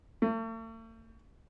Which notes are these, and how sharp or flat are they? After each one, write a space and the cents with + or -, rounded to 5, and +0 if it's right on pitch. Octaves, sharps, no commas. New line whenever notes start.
A3 +45